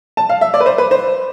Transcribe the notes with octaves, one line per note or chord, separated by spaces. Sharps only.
A5
F5
E5
D5
B4
C5
B4
C5